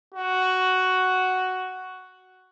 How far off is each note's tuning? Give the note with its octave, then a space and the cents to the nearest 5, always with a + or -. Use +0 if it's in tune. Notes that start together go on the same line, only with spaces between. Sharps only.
F#4 +5